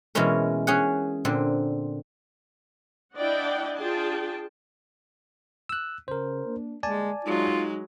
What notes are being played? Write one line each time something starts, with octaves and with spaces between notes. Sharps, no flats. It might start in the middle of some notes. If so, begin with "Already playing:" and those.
B2 E3 G#3 A#3 C#4 A#4
C#4 G#4 F#5
A#2 D3 C4
D4 E4 D5 D#5 F#5 G5
D4 F4 G#4 G5 A5
E6 F#6
C#3 A#4 C5
A#3 D4
G1 G#3 A#3 D5 G#5 A5
F#3 G#3 D#4 F4